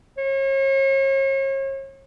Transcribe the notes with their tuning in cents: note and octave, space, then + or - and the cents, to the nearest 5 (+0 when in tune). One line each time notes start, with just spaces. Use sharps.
C#5 -40